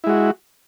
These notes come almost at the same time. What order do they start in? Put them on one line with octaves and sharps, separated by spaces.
E4 G#3 F#4